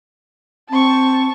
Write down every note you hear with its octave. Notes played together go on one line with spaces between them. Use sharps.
C4 A5 C#6